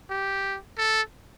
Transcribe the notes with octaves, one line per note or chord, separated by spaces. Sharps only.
G4
A4